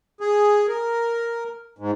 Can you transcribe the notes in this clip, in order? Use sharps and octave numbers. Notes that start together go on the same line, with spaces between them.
G#4
A#4
G#2